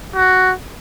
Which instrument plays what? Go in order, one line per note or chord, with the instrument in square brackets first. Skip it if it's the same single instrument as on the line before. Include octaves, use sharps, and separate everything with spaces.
[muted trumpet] F#4